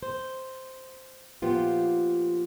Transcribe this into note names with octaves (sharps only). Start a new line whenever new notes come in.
C5
A#2 F3 B3 F4 G4